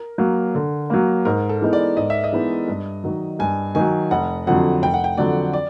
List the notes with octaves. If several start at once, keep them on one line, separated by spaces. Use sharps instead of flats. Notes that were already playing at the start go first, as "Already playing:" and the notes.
Already playing: A#4
F#3 A#3
D3
F#3 A#3
G#2 A#4
A4
E3 G#3 B3 D#4
D5
G#2 D#5
E5
D#5
E3 G#3 B3 D#4
G2
D#3 F#3
G2 G#5
D#3 F#3 G#5
F1 F#5
F2 D3 F#3 F#5
F1 G5
F#5
G5
F2 D3 F#3 D5
D5